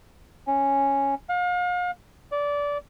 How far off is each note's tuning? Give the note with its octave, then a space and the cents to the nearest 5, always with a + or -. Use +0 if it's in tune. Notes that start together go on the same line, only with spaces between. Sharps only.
C#4 -5
F5 +40
D5 -20